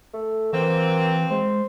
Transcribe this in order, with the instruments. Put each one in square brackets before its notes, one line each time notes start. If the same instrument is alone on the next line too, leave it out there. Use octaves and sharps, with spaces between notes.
[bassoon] A3
[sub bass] E3 [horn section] F#3 C4 [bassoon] A#3
[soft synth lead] G#3 [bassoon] C5